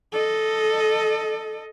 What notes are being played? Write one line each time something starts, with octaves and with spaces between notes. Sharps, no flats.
A4 D#5